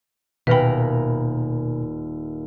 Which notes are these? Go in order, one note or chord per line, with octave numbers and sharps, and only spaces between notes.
D#1 B2 A#4 B4 G5 G#5 B5